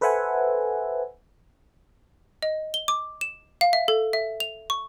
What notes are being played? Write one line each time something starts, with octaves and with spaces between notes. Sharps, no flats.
A4 B4 C5 E5 F#5 G#5
D#5
G7
D6
E7
F5
E5
A4
E5
F7
C#6